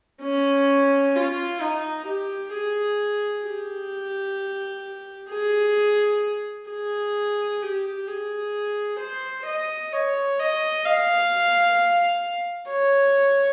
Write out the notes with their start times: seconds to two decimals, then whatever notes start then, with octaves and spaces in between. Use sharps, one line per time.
0.23 C#4
1.16 F4
1.62 D#4
2.07 G4
2.54 G#4
3.46 G4
5.31 G#4
6.70 G#4
7.63 G4
8.08 G#4
9.00 C5
9.47 D#5
9.93 C#5
10.40 D#5
10.85 F5
12.70 C#5